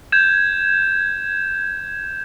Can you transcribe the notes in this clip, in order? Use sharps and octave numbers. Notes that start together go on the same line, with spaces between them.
G6 G#6 E7